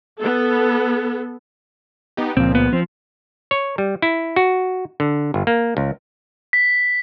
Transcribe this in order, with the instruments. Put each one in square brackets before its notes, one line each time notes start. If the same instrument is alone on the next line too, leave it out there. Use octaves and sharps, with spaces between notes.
[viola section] B3 A4
[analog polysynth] B3 D#4 G4
[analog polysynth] C#2 F3 [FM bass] A#2 [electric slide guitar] C4
[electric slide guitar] B3
[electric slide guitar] F3 [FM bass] C4
[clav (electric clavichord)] C#5
G3
E4
F#4
D3
G1
A#3
C#2
[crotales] B6